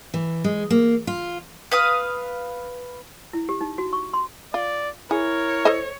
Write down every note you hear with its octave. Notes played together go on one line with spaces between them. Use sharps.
E3
G#3
A#3
F4
B4 F5 D#6
E4
G4
D#4
F#4
C#6
C6
F4 D5
E4 G#4 A#4 C#5
A4 C5 D#5